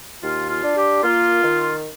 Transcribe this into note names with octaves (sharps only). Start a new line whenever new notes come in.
D#2 F4
F4
D4
G4
A#3 F4
D#3